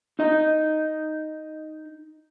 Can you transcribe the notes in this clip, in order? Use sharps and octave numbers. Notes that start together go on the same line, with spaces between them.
D#4 D#5